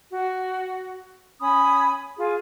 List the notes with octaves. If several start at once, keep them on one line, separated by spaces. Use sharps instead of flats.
F#4
C#4 G#5 B5 D#6
F4 G#4